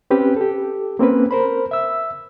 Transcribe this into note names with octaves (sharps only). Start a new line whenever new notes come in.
C4 C#4 G4 B4
G4 A4
A#3 C4 C#4 B4
A#4 C5 B5
E5 E6